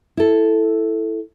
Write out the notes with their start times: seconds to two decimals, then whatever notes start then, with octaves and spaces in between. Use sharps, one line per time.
0.17 E4 A4